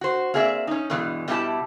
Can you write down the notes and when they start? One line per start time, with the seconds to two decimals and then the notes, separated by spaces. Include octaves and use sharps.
0.01 F#4 C5
0.34 A#3 C4 G#4 D5 E5
0.67 C#4 D#4
0.90 G2 B2 E3 G#3
1.28 B2 G3 D4 E4 G4 A5